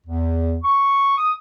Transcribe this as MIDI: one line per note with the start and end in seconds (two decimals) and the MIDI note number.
0.07 0.58 40
0.64 1.16 85
1.18 1.35 87